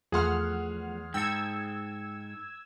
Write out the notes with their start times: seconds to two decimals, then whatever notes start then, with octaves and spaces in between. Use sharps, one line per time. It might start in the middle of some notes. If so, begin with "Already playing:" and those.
0.12 E2 F3 A3 G#4 F#5 C6 F6
1.14 G#2 A4 G5 E6 G#6